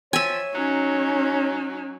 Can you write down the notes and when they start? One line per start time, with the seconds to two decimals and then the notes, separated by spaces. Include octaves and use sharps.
0.13 F3 C#5 E5 G#5
0.55 F#3 C#4 D#4